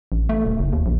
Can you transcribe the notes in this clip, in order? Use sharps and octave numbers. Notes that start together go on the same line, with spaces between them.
A1
A3
D#1
F#1
D#2
A#1